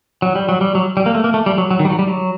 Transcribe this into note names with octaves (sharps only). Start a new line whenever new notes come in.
F#3
G3
F#3
G3
F#3
G3
A#3
A3
A#3
A3
G3
F#3
F#3
D#3
G3
F#3
G3
F#3